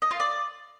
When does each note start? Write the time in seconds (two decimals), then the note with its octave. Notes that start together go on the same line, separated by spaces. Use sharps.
0.02 D#5
0.11 F4
0.20 D5